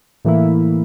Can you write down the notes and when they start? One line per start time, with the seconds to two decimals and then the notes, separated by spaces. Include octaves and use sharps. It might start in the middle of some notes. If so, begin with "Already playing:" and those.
0.25 A2 E3 A#3 E4